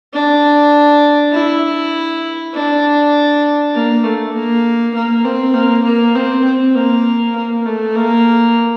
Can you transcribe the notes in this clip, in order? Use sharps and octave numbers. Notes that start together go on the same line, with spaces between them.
D4
E4
D4
A#3
A3
A#3
A#3
C4
A#3
A#3
C4
C4
A#3
A#3
A3
A#3